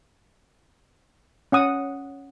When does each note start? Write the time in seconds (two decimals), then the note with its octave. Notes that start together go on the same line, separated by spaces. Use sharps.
1.52 C#4 F#5 D#6